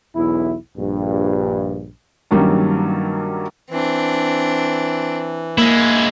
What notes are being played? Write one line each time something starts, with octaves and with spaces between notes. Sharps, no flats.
B1 E2 E4
A#1 G2
G2 D#3 F#3 G3 A#3 C#4
E3 C4 D4
G#3 A#3 E4